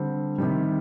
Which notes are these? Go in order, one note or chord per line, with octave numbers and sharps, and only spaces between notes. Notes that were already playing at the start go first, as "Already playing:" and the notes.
Already playing: D3 G3 C4
C3 D#3 G3